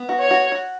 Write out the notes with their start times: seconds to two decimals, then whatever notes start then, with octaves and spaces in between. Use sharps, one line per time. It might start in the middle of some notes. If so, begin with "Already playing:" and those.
Already playing: B3
0.09 F#4
0.20 C#5
0.31 F#4
0.52 F#4